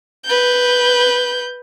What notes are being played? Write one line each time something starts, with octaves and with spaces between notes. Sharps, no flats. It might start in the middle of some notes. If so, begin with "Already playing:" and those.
B4 G6